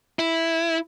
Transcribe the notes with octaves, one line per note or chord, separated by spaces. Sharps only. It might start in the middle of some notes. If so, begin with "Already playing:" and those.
E4